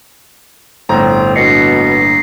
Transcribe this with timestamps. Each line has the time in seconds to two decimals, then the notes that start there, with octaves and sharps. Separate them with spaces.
0.89 G1 A2 C4 A#5
1.36 B2 A#3 D4 A#6 C7 C#7